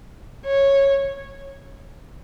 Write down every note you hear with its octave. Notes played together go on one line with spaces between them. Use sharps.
C#5